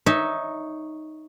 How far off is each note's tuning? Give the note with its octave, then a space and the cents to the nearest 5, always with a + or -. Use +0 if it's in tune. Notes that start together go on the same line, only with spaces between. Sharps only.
D#4 +0 C#5 -5 E5 -15